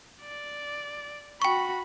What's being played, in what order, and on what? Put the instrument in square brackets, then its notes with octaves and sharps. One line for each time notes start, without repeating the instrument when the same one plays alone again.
[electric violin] D5
[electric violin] F#4 B5 [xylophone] G5 C#6